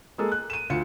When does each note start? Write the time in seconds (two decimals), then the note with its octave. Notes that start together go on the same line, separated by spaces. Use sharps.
0.18 G#3 A#3 G#4 A4
0.32 F#6
0.50 D#7 E7
0.70 D2 F4 C#7